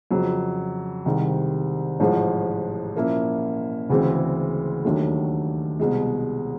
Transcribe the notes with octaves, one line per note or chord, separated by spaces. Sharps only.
F2 C#3 F#3
C2 C3 D#3 G#3
A1 G#2 F3 G#3
A#2 F3 A#3 C#4 E4
D2 C#3 E3 G#3 C4
D#2 D#3 F#3 A3 D4
C2 B2 G#3